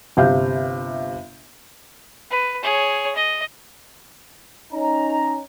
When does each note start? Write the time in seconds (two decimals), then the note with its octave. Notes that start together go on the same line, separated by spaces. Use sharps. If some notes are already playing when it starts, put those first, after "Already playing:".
0.17 G1 C3 F5 G6
2.31 B4
2.63 G#4 C#5
3.15 D#5
4.72 C#4 D#4 A#5